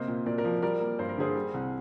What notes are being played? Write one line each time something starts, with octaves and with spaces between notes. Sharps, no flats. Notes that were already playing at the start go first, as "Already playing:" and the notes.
Already playing: C3 A#3 C5 D#5
A#2
A#2 A#4 D5
A#4 D5
F3
G3 A#4 D5
A#3
G2 C5
A#4
D3 G#4 C5
G3
C2